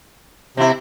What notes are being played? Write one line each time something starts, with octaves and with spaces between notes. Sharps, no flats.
C3 C4 E4